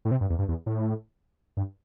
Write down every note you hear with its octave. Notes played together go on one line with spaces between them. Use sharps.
A2
C3
G2
E2
G2
E2
A2
G2